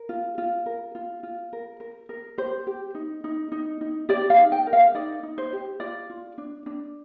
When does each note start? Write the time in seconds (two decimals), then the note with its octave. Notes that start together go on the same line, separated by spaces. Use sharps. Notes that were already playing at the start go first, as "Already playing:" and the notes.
Already playing: A#4
0.09 F4
0.38 F4
0.66 A#4
0.95 F4
1.23 F4
1.53 A#4
1.80 A#4
2.09 A#4
2.38 G4 C5
2.67 G4
2.95 D#4
3.24 D#4
3.52 D#4
3.81 D#4
4.09 G4 D5
4.30 F5
4.38 D#4
4.52 G5
4.67 A#4
4.73 F5
4.94 D#4 D5
5.23 D#4
5.38 C5
5.53 G4
5.80 F4 D5
6.10 F4
6.38 D4
6.66 D4